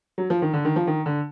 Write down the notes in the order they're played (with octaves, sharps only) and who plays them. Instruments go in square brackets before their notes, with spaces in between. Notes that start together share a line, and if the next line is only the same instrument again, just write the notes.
[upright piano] F#3
F3
D#3
D3
D#3
F3
D#3
D3